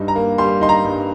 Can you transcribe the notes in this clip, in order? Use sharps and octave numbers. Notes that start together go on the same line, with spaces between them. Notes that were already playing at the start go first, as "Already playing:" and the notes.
Already playing: G2 G3 D#4
A#5
A#3
G3 C6
D#4 C6
A#5
G2